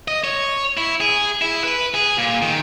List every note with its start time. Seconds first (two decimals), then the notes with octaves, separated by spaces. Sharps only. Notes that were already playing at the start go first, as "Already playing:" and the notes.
0.08 D#5
0.24 C#5
0.77 E4
1.00 G#4
1.42 E4
1.64 B4
1.94 G#4
2.17 A#2
2.42 D#3